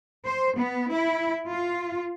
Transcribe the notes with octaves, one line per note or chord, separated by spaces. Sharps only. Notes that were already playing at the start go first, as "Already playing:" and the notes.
C5
B3
E4
F4